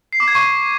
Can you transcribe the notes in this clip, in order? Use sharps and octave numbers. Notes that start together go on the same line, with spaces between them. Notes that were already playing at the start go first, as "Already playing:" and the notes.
C7
D6
G#6
C#6